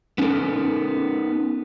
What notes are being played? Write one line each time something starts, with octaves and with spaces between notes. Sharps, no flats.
B3 C#4 D#4 A4 A#4